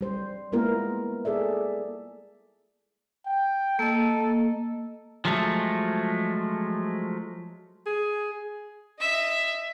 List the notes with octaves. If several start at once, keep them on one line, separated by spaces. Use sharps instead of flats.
G3 C5
G#3 A#3 B3 E4 F4 A#4
G#4 A4 D5 E5
G5
A#3 A4 D#5
F3 F#3 G#3 A3
G#4
D#5 E5